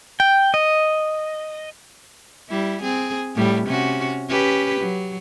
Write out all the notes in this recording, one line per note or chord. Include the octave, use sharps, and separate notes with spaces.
G5
D#5
G3 E4
C4 G#4
A2 G3
C3 C#4 F#4
C#4 G4 B4
F#3